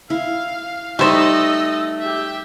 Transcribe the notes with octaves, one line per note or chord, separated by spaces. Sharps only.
E4 F5
G3 A3 D#4 C5 D#5 E6
G4 E5